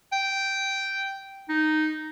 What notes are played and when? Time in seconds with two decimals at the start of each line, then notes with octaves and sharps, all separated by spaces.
0.12 G5
1.49 D#4